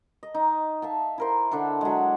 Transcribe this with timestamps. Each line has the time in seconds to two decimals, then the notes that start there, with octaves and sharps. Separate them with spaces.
0.23 D#5
0.34 D#4
0.82 E5 F5 A5
1.18 E4 A#4 C5
1.51 D3 D4 E4 A4
1.81 F#3 G#3